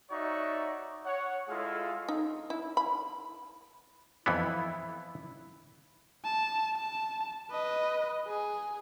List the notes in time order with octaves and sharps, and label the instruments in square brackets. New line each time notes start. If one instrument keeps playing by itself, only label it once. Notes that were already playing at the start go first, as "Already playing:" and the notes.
[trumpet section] D#4 F#4 C#5 D5 E5 C#6
C#5 F#5
G#3 E4 F4 G#4 A4 F5
[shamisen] D#4
E4
B5
[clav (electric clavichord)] F2 E3 B3 [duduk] E4 [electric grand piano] B5
[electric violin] A5
A5
B4 D#5
G#4